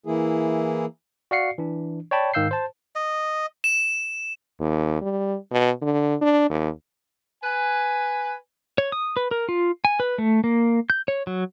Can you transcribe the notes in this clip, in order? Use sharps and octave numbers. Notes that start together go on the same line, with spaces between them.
E3 A#3 E4 G#4
F#4 D5 F5 F#5 C7 C#7
E3 D4
C#5 D5 G5 A5 B5
G#2 D#3 F5 E6 G6 C7
C5 A5
D#5
E7
D#2
G3
B2
D3
D4
D#2
B4 G#5
C#5
D#6
B4
A#4
F4
G#5
B4
A3
A#3
G6
C#5
F#3